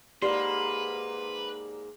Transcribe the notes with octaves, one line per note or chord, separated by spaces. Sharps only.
G#2 A#3 G4 B4 D5 C6